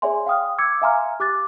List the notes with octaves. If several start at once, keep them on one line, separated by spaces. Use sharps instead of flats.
G#4 C#5 D5 E5 G#5 C6
F5 G5 D#6 F6
D6 E6 G#6 C#7
E5 F5 G#5 A#5 C6 F6
G4 D6 F#6 A6